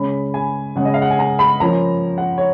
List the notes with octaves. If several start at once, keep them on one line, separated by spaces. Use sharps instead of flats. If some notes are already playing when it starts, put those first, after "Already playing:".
Already playing: C#3 G#3 C#4 B5
G#5
C#3 G#3 C#4 F#5
D#5
F5
F#5
G#5
A#5
B5
F3 A#3 C#4 A#5
F#5
C#5